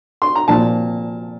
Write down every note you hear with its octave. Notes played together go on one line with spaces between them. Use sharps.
C6
A#5
A#2 F3 A5